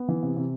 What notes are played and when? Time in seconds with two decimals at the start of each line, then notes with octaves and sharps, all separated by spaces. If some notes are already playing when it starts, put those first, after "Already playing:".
Already playing: B3
0.08 E3
0.23 C3
0.37 C3